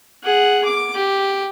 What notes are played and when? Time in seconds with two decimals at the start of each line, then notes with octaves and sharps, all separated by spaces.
0.24 G#4 F#5
0.64 D6
0.95 G4